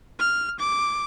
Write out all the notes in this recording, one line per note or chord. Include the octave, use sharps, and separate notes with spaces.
F6
D6